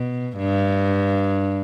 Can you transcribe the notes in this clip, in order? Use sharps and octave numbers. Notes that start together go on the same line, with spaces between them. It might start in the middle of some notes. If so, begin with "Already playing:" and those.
Already playing: B2
G2